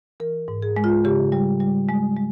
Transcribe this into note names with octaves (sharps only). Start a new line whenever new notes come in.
E3 A#4
G#2
G#4
G#3
F4
C#3 G4
G3
G3
G#3
G#3